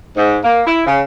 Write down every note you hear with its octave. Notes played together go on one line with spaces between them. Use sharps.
G#2
A#3
E4
C#3